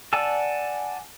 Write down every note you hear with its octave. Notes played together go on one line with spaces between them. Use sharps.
D5 F#5 G#5 A5 E6